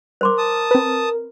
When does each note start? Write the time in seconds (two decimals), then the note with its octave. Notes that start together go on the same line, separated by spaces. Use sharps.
0.21 A#4 C5 C6 D6
0.38 A5 D#6
0.71 C4 B4